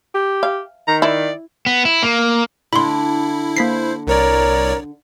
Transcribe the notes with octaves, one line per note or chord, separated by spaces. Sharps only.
G4
F5
D#3 A#5
E4 D5
B3
E4
A#3
D3 D4 E4 B5 C6
A#3 C5 B6 C7
C2 A#4 C#5 D5